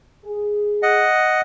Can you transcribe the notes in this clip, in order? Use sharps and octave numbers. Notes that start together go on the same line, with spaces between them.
G#4
D#5 F#5